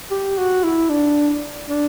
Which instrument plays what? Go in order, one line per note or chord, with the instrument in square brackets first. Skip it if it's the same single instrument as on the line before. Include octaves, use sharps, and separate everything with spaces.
[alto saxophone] G4
F#4
E4
D4
D4